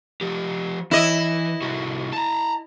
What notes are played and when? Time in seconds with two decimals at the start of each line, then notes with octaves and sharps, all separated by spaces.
0.21 F3 G4
0.91 E3 E4 D#5
1.62 C2 F#4
2.13 A5 A#5